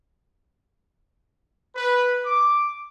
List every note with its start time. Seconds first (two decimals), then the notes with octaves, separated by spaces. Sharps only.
1.75 B4
2.25 D6